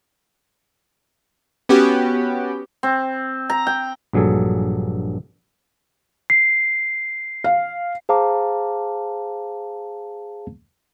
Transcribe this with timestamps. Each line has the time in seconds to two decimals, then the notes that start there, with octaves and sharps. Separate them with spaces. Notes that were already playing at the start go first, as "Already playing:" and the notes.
1.69 B3 C#4 F#4 G4
2.83 C4
3.50 A#5
3.67 G5
4.13 A#1 G2 F#3 G#4 A4
6.30 C7
7.44 F5
8.09 G#4 C5 F5 A5 A#5 D6